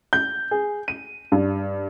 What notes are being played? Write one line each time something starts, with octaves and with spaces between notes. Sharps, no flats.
G6
G#4
D#7
G2